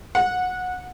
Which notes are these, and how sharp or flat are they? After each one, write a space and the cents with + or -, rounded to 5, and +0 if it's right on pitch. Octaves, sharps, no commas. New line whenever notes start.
F#5 -20